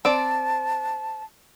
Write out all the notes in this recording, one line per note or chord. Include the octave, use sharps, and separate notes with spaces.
C4 D5 A5